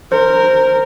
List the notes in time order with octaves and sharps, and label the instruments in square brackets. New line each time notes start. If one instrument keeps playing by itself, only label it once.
[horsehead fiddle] A#4 [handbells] C5